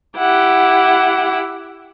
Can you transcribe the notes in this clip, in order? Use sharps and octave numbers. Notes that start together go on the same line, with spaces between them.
E4 G4 F#5